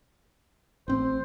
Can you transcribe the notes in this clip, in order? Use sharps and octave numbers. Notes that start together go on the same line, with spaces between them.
A1 C4 C5